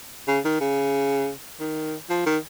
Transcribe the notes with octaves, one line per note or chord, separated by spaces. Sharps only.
C#3
D#3
C#3
D#3
F3
D#3